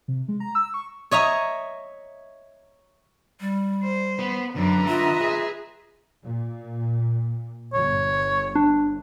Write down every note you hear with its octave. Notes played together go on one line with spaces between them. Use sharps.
C3
G#3
A#5
E6
C#6
C#5 D#5 E5 A#5
G3
C5
B3 B5
F#2 D3 B4 A#5
F4 D#5 E5
G#4
A#2
G1 C#5
D4